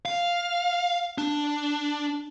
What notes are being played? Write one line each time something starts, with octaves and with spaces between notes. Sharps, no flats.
F5
D4